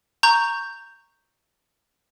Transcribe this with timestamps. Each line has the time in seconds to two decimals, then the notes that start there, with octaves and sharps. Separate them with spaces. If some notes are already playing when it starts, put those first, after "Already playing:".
0.23 A#5 C#6 G6